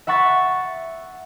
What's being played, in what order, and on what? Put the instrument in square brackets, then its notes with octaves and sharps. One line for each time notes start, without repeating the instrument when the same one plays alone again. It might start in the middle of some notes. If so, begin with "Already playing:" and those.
[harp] E5 F#5 B5 C#6 A6